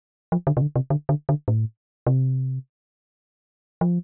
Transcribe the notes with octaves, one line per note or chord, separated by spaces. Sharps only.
F3
D3
C3
D3
C3
D3
D3
D3
A2
C3
F3